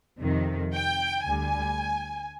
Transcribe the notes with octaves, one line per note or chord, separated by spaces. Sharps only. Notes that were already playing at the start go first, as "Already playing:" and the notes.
F2 C3 D#3
G5
D2 D3 G3 G#5